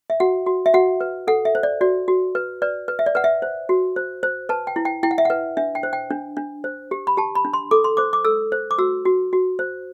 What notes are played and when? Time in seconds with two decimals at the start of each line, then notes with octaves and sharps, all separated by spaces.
0.10 E5
0.20 F#4 F#5
0.46 F#4
0.66 E5
0.74 F#4 F#5
1.01 B4
1.27 A4 F#5
1.45 E5
1.55 C5
1.63 D5
1.81 F#4 D5
2.08 F#4
2.35 B4
2.62 B4 D5
2.88 B4
2.99 E5
3.06 D5
3.15 B4 F#5
3.24 E5
3.42 C5
3.69 F#4
3.96 C5
4.23 C5
4.49 B4 A5
4.67 G5
4.76 E4
4.85 G5
5.03 E4 G5
5.11 F#5
5.18 E5
5.25 B4 F#5
5.57 D4 E5
5.75 G5
5.83 C5
5.93 G5
6.10 D4
6.37 D4
6.64 C5
6.91 G4
7.07 B5
7.17 G4 A5
7.35 B5
7.45 D4
7.53 C6
7.71 A4 D6
7.84 C6
7.97 C5 D6
8.13 D6
8.25 A4 E6
8.52 C5
8.71 D6
8.78 F#4 E6
9.05 F#4
9.33 F#4
9.59 C5